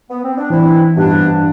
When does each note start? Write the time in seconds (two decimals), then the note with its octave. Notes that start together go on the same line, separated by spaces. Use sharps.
0.09 B3
0.22 C4
0.36 D4
0.50 E3 C4 E4
0.96 G2 B3 D4